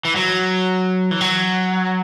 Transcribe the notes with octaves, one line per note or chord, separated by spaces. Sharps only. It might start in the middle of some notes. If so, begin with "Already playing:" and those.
E3
F#3
E3
F#3